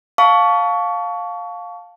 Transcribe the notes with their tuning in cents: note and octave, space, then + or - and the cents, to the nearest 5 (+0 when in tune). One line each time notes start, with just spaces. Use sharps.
F5 +15 A5 +0 C#6 +25